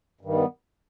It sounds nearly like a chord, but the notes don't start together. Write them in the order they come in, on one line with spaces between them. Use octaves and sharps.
G2 D#3 G3 B3